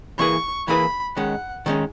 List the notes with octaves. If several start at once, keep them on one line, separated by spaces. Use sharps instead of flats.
E3 A#3 E4 G#4 B4 C#6
E3 A#3 E4 G#4 B4 B5
D#3 G#3 C#4 F#5
D#3 G#3 C#4